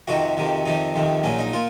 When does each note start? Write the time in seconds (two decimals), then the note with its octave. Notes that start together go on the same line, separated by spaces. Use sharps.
0.08 F2 C3 D#3 F#4
0.37 F2 C3 D#3
0.66 F2 C3 D#3 D#4
0.94 F2 C3 D#3
1.23 A#1 A#2 F#3 C#4
1.39 D#4
1.53 A#2 F4